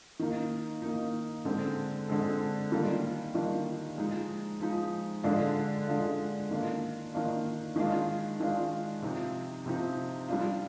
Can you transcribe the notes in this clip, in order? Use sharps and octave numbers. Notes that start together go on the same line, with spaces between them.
D#3 A#3 D#4
D#3 A#3 D#4
D3 G#3 C4
D3 G#3 C4
D#3 G3 A#3 D4 F4
D#3 G3 A#3 D4 F4
F3 G#3 D#4
F3 G#3 D#4
D3 G#3 D4 F4
D3 G#3 D4 F4
D#3 A#3 D4 F4
D#3 A#3 D4 F4
D#3 G#3 D4 F4
D#3 G#3 D4 F4
C3 F3 C4 D#4
C3 F3 C4 D#4
G3 D4 F4